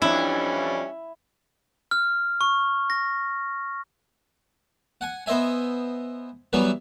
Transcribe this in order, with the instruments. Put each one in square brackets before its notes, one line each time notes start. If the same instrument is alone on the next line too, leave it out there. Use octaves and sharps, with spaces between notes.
[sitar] F2 D4 [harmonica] E3 G3 C#4 [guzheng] E4
[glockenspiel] F6
C#6
A#6
[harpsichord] F#5 G#5
B3 C5 D#5 E5 G#5
E3 F#3 G3 B3 B4